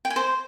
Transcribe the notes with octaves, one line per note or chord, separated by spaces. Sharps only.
G5
G#5
C5